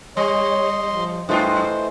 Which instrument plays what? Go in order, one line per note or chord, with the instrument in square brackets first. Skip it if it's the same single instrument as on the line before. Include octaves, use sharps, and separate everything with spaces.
[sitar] G3 [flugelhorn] C#5 [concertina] D#5 C6
[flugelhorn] F3
[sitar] F#2 F4 [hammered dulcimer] E3 A3 D#5 [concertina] C5 [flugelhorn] G5